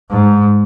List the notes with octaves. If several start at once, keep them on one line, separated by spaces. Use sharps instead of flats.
G#2